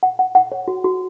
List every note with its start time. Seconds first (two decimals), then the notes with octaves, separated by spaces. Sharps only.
0.03 F#5
0.19 F#5
0.35 F#5
0.52 C#5
0.68 F#4
0.84 F#4